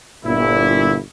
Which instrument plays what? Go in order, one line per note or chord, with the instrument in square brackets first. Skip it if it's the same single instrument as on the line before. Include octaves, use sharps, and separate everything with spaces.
[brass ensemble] G1 A#2 E4